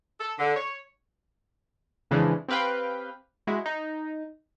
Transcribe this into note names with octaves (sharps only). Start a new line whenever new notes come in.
A4
D3
C#5
F2 C#3 E3 G#3 D4
C4 G4 B4 F5 G5
G#3 E4 F#4
D#4